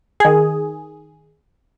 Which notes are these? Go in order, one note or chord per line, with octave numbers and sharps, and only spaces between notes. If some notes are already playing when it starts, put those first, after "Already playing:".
D#3 G#4